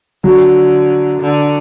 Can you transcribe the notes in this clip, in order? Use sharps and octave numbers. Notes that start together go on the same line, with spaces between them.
D3 F#3
D3